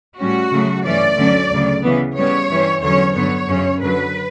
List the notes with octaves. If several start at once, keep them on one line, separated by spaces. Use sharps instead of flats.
A2 G3 C#4 F#4
C#3 F#3 A3
G2 E3 A3 C#4 D5
D2 D3 F#3 A3 C#4
D2 C#3 F#3
C#3 E3 B3
C#3 G3 B3 C#5
G2 E3 G3 C#4
E2 D3 F#3 C#4 C#5
G2 D3 F#3 B3 C#5
F#2 C#3 F#3 C#4
F#2 D3 F#3 B4